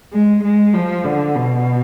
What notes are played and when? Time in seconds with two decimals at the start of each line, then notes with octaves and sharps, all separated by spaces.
0.13 G#3
0.44 G#3
0.74 F3
1.04 D3
1.35 B2